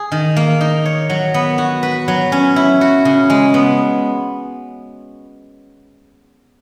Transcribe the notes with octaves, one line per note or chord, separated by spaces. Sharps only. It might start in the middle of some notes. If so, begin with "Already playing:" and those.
Already playing: G#4
D#3
A#3
D#4
C#5
F#3
B3
F#4
B4
F#3
C#4
E4
F#4
C#3
G#3
B3